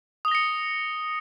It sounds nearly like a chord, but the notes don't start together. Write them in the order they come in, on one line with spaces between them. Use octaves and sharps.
D#6 G7 A#6 C#7